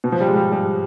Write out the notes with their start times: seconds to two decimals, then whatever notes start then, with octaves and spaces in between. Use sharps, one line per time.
0.04 B2
0.12 F3
0.21 G3
0.28 G#3
0.36 G3
0.52 G3